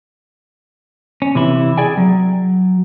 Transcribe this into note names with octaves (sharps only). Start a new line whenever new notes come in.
C#4
C3 E3 E4
G#4 D5 G5 G#5
F#3